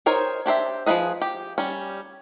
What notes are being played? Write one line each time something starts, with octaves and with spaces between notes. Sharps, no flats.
D#4 A#4 C5 C#5 D#5
D4 G4 C5 E5
F3 B3 G#4 B4 D#5
G4
G3 C#4